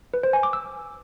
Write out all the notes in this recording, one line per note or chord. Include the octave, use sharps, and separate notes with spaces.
B4
C5
G#5
D6
E6